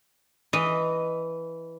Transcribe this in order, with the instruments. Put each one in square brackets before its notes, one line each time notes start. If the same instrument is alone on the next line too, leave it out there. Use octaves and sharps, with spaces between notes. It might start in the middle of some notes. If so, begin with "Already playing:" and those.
[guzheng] E3 D#5